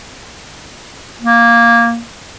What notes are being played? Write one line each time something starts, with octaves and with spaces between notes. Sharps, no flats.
A#3